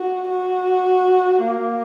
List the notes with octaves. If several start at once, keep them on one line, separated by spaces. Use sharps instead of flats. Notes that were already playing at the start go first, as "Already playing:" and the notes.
Already playing: F#4
F#4
A#3